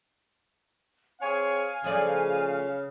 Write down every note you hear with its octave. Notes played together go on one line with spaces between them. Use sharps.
C4 G#4 C#5 F5 G#5
C#3 F3 A3 D5